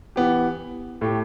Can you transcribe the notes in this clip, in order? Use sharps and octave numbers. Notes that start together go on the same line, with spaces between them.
E3 B3 G4
A2 A3 G4